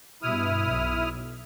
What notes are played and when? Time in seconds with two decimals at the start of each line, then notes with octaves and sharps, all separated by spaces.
0.22 G2 B2 E4 D#6 F6
0.69 B1